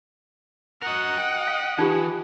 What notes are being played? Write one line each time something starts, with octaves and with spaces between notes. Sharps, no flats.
F#4 A#4 D#5 F#5
G5
F5
E3 D#4 F4 G4